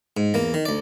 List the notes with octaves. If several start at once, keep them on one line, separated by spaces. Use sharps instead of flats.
G#2
E2 A#3
D#3
D2 D5